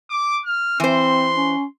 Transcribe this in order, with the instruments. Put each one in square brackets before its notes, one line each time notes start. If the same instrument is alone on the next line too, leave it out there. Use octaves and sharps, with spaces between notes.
[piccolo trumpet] D6
F6
[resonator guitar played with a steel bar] E3 C5 [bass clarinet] C4 [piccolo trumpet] C6
[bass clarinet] C#4